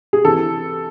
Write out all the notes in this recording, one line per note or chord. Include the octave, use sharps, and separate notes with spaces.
G#4
C3 E3 A4